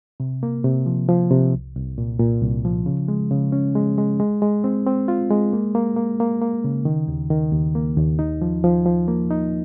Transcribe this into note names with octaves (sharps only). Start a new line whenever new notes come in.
C3
A#3
C3
F3
F3
C3
C2
C2
A#2
A#2
C2
F3
C#3
G#3
C#3
C#4
G#3
G#3
G#3
G#3
C4
C4
F4
G#3
A#3
A#3
A#3
A#3
A#3
C#3
D#3
D#2
D#3
D#2
A#3
D#2
D#4
F3
F3
F3
A#3
D#4